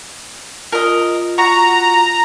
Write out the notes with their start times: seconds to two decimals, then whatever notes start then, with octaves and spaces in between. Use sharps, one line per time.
0.72 F4 A#4 D#5
1.38 F#4 A#5